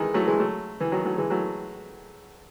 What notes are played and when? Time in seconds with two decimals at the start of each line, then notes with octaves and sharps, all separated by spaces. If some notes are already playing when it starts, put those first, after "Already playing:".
Already playing: D#3 E3 G#3
0.14 F#3 A3
0.27 E3 G#3
0.40 F#3 A3
0.80 E3
0.92 D#3 F#3
1.05 F#3 A3
1.18 E3 G#3
1.30 F#3 A3